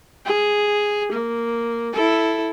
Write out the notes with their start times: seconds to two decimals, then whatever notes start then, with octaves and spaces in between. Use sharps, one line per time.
0.25 G#4
1.12 A#3
1.93 E4 A4